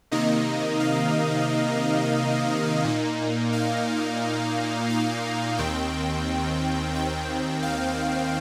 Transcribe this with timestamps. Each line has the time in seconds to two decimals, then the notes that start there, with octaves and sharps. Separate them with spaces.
0.11 C3 D#3 A#3 D#4 D#5
0.80 F5
2.85 A#2 A#3 D#4
3.53 F5
4.90 F5
5.58 D#2 D#3 C4 G5
6.95 G5
7.63 F5